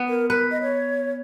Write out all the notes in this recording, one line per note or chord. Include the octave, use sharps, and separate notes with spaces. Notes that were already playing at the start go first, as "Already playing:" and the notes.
Already playing: B3
A#4
A#4 B4
D#5
C#5